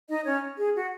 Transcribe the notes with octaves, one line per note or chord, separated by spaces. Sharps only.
D#4 D#5
C#4 C#5
G#4
F#4